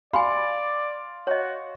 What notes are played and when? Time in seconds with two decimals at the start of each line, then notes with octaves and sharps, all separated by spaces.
0.13 D5 F5 G#5 B5 C6
1.27 F#4 C#5 D#5